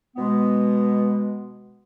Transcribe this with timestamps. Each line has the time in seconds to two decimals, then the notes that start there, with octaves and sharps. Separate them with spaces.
0.16 B2 G#3 B3